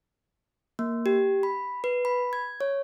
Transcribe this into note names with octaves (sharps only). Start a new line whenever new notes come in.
A#3
G4
B5
B4
B5
G#6
C#5